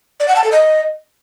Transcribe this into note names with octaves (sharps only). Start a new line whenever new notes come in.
D5
F#5
A5
A4
D#5